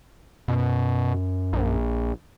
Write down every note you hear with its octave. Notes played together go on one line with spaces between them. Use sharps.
F#2 B2
A#1